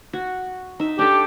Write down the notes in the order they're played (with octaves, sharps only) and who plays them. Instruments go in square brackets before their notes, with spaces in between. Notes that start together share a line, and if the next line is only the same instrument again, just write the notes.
[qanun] F#4
D#4 E5
[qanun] D4 A4 [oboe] G4